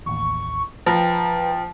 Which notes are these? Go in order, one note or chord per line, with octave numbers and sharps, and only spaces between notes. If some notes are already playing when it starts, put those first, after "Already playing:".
A1 D#2 C#6
F3 B4 G5 A#5